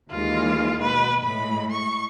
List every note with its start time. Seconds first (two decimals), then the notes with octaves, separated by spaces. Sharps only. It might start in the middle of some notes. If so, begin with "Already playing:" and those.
0.11 D#2 E3 G#3 F4
0.82 B2 B4
1.22 A2 G#3 B5
1.71 C#6